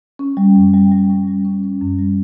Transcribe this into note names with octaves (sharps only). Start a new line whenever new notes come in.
C#4
G3
F#2
G3
G3
C#4
G3
C#4
C#4
F#2
G3